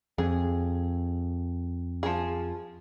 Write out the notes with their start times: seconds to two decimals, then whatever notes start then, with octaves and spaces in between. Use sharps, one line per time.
0.18 F2 G#4
2.03 F3 G#4